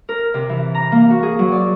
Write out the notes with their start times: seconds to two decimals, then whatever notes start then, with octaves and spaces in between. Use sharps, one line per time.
0.09 A#4
0.34 C3
0.49 E3
0.75 A#5
0.92 A#3
1.10 F#4
1.23 G#4
1.39 F#3
1.52 D5